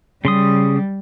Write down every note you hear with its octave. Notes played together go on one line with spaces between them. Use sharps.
C#3 G3 C6 D#6